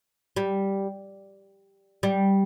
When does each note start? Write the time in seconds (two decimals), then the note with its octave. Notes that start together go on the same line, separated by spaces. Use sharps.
0.36 G3
2.03 G3